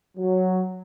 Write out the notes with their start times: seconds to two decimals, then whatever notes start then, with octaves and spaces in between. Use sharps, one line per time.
0.18 F#3